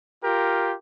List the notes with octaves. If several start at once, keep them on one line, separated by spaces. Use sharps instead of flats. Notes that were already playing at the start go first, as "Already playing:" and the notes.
F4 G4 A#4